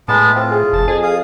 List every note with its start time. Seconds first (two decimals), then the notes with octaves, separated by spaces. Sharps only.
0.08 A2 G#3 B3 A5
0.35 C4 F4
0.51 G#4
0.73 F1 A5
0.88 F2 G#4
1.03 F5 D#6